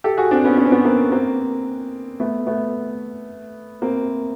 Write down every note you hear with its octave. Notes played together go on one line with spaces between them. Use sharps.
G4 A4
F#4 G#4
C4 D4
B3 C#4
C#4
C4
B3 C#4
A#3 C4
A#3 C4
A3 B3
A3 B3
A#3 C4